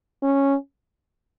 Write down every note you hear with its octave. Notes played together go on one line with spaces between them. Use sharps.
C#4